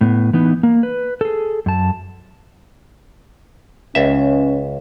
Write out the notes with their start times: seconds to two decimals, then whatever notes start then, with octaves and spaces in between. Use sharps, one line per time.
0.01 A2 B3
0.33 E3 B3 D#4
0.63 A#3
0.83 B4
1.21 G#4 A4
1.66 F#2 A5
3.95 C#2 C#4 E5